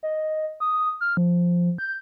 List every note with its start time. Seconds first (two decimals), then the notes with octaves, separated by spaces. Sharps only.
0.03 D#5
0.60 D#6
1.01 F6
1.17 F3
1.78 G6